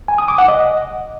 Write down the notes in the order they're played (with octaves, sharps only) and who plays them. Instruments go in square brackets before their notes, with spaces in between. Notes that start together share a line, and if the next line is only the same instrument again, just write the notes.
[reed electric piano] G#5
D#6
D6
F#5
D#5